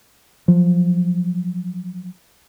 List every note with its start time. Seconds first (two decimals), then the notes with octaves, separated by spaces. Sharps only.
0.48 F3 F#3